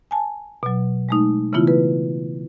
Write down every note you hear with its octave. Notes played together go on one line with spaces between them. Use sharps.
G#5 A5
B2 F#3
G#3 A3 D#4
C#3 E3 A3 B3 E4 F4
B4